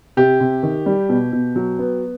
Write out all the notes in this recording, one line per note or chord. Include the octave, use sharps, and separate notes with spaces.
C3 G4
C3
D#3
G3
B2
B2
F#3
B3